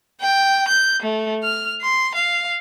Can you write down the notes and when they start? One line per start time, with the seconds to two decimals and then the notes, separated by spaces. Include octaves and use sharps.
0.21 G5
0.68 G6
1.02 A3
1.43 F6
1.81 C6
2.15 F5